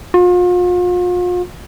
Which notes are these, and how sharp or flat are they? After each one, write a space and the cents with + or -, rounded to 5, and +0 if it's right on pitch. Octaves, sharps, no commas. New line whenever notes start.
F4 +40